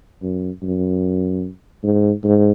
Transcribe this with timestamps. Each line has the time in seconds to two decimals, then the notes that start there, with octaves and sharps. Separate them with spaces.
0.23 F#2
0.63 F#2
1.83 G#2
2.24 G#2